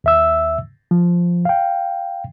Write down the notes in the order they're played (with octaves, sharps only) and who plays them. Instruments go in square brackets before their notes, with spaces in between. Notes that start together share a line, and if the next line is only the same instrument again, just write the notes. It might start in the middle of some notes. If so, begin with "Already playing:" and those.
[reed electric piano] D#2 E5 E6
F3
F5 G5